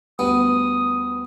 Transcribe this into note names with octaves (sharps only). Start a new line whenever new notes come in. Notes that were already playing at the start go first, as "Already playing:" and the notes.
D2 G2 B3 D#6